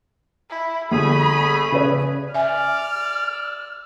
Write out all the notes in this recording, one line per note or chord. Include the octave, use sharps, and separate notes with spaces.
E4
G1 A3 G#4 B5
C#3 B4 D5
D5 E5 G#5 F6